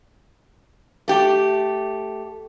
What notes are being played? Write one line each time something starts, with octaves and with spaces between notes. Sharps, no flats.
A3 G4